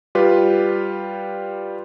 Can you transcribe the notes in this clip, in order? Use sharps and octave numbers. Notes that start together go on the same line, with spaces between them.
G3 F4 G4 B4